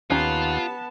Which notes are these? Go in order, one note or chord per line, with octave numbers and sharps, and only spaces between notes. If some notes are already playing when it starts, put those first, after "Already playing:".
D#2 B3 C#4 F4 G4 F#5 A5 A#5